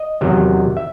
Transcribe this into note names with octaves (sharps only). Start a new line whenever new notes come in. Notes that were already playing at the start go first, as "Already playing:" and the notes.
Already playing: D#5
E2 C3 D#3 F#3
E5